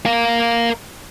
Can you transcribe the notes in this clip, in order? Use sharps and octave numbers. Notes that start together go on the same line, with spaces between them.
A#4 F5